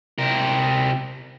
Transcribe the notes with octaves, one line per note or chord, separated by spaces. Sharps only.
C3 A#4